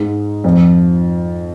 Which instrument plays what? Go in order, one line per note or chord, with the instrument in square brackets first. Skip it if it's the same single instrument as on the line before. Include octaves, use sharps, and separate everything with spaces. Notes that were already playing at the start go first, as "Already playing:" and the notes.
Already playing: [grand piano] G#2 G#3
F2 F3